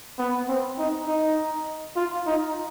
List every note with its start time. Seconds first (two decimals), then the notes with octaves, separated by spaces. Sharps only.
0.19 B3
0.48 C4
0.78 D#4
1.07 D#4
1.96 F4
2.27 D#4